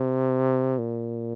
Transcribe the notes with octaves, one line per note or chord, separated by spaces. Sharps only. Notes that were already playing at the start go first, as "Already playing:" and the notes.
Already playing: C3
A#2